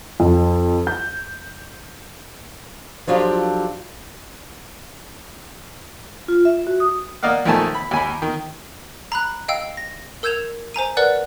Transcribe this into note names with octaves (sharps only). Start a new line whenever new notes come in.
F2
G6
F3 F#3 D4 F4 G4 A4
F4
E5
F#4
D#6
A#3 D5 D#5 F5 F#5
A#1 D#3 A3 G#5 A5
B5
D#2 G#5 B5
D#3
A#5 B5 F#6
D#5 F5 G5 E6
A#6
A#4 E6 G6 G#6 E7 F7
C5 G#5 A#5 D#7
A#4 B4 D5 F#5 F#6